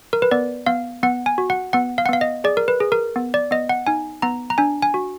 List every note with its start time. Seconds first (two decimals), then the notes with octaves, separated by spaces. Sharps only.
0.13 A#4
0.22 B4
0.31 B3 D5
0.66 B3 F5
1.03 B3 F#5
1.26 G#5
1.38 F#4
1.50 F#5
1.73 B3 F#5
1.98 F5
2.06 F#5
2.09 B3 F5
2.21 D#5
2.44 G#4 D5
2.57 A#4
2.68 B4
2.80 G#4
2.92 A#4
3.16 B3
3.34 D5
3.51 B3 D#5
3.69 F#5
3.87 D#4 G#5
4.22 B3 A#5
4.50 A#5
4.58 D4 G#5
4.82 G#5
4.94 F#4